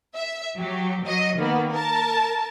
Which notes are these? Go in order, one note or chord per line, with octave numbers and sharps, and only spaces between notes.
E5
F#3 G4
F#3 D#5
D#3 A#3 B3
A#4 A5